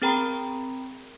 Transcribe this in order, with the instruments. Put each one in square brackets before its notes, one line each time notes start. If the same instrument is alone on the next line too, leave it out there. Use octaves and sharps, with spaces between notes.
[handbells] C4 G#4 A#4 G5 A#5 B5